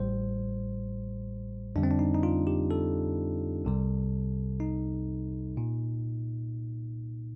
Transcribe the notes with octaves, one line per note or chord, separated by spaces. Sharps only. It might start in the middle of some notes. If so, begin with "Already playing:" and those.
Already playing: A1 A2 G3 C5
F2 D3 G3 D4
C4
D4
D#4
D#4
F4
G4
A4
C2 C3 G3
D#4
A#2